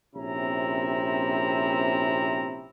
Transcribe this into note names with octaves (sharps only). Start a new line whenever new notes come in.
A#1 C3 C4 C#4 E4 A#5